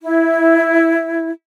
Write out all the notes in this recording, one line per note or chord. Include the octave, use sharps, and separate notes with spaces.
E4